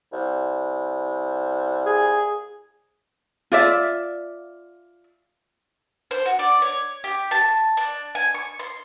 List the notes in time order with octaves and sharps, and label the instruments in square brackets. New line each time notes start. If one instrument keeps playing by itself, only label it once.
[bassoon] C2
[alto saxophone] G#4
[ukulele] F4 D5 E5
[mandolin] C5
F#4
D5
C#5
G4
A5
D4
G#5
C#6
C6